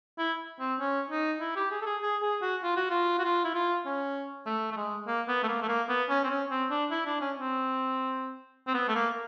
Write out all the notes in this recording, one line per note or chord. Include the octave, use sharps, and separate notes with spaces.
E4
C4
C#4
D#4
E4
G4
G#4
A4
G#4
G#4
G#4
F#4
F4
F#4
F4
F#4
F4
E4
F4
C#4
A3
A3
G#3
A#3
B3
A3
A#3
A3
A#3
B3
C#4
C4
C#4
C4
D4
E4
D4
C#4
C4
C4
B3
A3
A#3